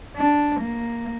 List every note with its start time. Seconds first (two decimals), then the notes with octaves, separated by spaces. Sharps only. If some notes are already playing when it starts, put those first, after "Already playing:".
0.16 D4
0.61 A#3